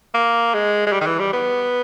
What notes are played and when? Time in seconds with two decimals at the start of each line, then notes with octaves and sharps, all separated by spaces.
0.14 A#3
0.54 G#3
0.87 G#3
0.93 G3
1.01 D#3
1.07 E3
1.19 G3
1.33 B3